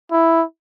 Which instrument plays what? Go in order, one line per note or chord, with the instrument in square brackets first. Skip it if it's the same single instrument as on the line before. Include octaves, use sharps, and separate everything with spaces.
[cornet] E4